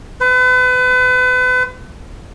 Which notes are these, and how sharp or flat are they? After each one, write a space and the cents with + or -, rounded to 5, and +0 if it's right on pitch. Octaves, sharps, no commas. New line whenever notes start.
B4 +35